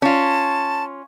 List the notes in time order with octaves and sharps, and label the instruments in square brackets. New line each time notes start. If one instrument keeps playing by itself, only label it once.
[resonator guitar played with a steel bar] C#4 F4 [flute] A5